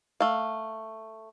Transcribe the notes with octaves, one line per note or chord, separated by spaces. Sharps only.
A3 F5